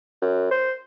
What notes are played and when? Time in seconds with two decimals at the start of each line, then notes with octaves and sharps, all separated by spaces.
0.22 F#2
0.51 C5